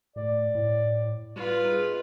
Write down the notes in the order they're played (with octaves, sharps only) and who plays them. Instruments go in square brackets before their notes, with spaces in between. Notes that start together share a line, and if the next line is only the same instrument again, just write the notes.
[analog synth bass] A2 [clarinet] D5
[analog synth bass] A2
[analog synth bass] G3 [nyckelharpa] F4 B4
[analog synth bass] D#4 [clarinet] G#4